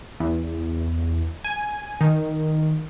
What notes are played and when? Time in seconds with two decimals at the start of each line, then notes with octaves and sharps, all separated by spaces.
0.20 E2
1.44 G#5
2.01 D#3